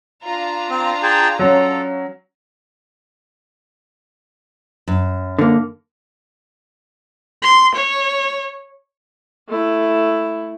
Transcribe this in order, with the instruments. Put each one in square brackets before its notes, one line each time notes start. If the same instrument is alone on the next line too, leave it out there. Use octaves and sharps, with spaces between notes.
[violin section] D4 F4 A#5
[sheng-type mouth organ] C4
G#4 G5 A5
[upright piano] F#3 C#4 [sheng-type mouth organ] A4
[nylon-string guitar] F#2
[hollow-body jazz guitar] D3 A#3
[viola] C6
C#5
[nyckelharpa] A3 E4